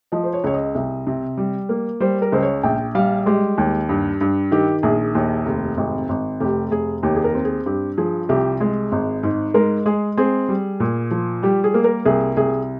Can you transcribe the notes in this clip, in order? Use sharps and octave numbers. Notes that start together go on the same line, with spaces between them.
F3 D#5
C5
C#5
C#2 C#5
D#5
C2
C3
G3
A#3
G3 C5
A#4
C#2 C5
C#5
A#1 G5
G3 F5
G#3 G4
D#2
G2
G2
D#3 G4
A#1 G#4
D#2
F1
G#1
G#1
F1 G4
F1 G#4
D#2 G4
G#4
A#4
C4
G#4
G2 G4
F3 G#4
C2 G4
G#3 G#4
G#1
G#2
G#3 A#4
G#3 G#4
C4 G#4
G3
A#2
F3
G3 G4
G#4
A#3
A#4
C2 G#4
C2 G#4